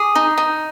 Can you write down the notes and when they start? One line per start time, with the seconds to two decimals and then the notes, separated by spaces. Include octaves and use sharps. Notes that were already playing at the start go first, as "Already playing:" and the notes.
Already playing: G#4 D6
0.15 D#4
0.38 D#4